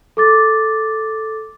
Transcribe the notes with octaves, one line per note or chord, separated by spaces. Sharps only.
A4 D6 A6